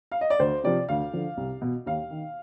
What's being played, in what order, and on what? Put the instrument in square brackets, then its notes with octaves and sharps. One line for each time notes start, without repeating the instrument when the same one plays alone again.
[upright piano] F5
D#5
D5
D2 C5
C3 F3 D5
D2 F5
D3 F3
C2
B2
D#2 F5
D#3